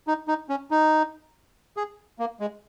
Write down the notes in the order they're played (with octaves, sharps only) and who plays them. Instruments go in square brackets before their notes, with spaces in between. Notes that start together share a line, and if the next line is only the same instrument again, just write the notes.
[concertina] D#4
D#4
C#4
D#4
G#4
A#3
G#3